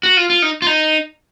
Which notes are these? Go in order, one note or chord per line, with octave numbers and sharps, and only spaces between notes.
F#4
F4
F4
D#4
F4
D#4